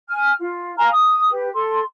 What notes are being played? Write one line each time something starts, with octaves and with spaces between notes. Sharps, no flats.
G#5 F6
F4
F5 G#5 A#5 F6
D#6
G4 B4
A4 C6